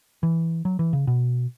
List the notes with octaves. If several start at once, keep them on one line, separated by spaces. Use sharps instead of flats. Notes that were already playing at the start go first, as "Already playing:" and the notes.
E3
F#3
E3
C#3
B2